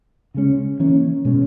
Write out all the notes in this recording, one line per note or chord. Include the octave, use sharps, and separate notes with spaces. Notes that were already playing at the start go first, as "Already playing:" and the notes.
C#3 G#3 C#4
E3 A#3 C#4
B2 G#3 C#4